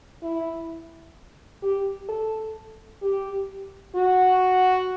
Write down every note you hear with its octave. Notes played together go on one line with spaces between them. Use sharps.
E4
G4
A4
G4
F#4